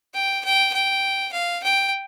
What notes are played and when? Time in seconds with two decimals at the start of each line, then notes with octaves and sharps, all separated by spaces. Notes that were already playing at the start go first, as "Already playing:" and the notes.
0.14 G5
0.44 G5
0.73 G5
1.33 F5
1.63 G5